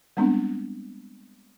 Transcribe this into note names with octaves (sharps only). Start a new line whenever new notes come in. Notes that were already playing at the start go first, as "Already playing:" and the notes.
G3 G#3 B3 C4 D4